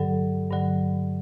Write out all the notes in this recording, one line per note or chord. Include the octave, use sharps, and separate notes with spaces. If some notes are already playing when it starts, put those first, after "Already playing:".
Already playing: G2 D3 F#3 A4
G2 D3 F#3